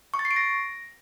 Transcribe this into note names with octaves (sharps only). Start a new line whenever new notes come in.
C#6
A6
C7
D7
A#6